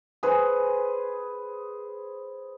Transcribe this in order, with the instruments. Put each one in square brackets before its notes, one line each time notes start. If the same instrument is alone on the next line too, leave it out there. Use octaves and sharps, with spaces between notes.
[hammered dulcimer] G#4 B4 C5